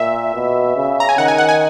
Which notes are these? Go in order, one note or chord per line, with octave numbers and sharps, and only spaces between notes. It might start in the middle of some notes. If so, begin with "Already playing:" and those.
Already playing: A#2 E5
B2
C#3
A#5
G#5
D#3 F#5
G#5
F#5
G#5